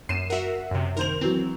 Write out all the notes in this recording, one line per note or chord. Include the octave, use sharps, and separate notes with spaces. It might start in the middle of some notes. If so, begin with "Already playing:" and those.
F#2 C7 D#7 E7
F#4 A#4 E5 F#5
F#2 C3
D#3 A#4 C5 F7
E3 F#3 C4